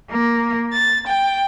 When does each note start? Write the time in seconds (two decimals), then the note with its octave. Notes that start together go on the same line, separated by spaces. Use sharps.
0.10 A#3
0.73 A6
1.07 G5